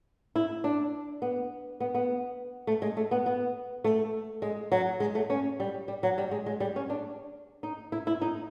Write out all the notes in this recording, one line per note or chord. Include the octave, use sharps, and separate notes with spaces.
E4
D4
B3
B3
B3
A3
G#3
A3
B3
B3
A3
G#3
F#3
G#3
A3
C#4
G3
G3
F#3
G3
G#3
G#3
G3
C#4
D4
D#4
E4
E4
D#4